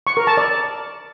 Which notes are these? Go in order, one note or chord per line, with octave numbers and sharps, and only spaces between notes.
C#6
A#4
A5
D5